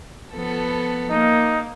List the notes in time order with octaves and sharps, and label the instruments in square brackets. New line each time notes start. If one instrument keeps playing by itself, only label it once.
[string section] F3 B3 A4
[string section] A#3 [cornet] D#4